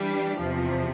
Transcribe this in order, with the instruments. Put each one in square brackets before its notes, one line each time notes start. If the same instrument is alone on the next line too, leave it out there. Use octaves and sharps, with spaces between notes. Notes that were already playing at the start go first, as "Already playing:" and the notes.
Already playing: [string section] E3 G3 D4 G4
E2 C3 F3